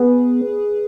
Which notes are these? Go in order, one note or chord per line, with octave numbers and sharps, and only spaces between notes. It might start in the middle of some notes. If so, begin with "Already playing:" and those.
Already playing: B3 G#4 B4